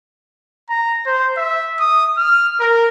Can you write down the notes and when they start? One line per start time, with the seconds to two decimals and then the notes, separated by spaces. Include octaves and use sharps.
0.70 A#5
1.06 C5
1.37 E5
1.79 D#6
2.18 F6
2.60 A#4